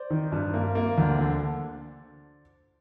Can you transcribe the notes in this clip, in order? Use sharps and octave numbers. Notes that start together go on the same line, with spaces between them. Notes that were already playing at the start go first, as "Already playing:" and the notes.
Already playing: C5 D5
D#3
G2
A#3
A#3
D2
D3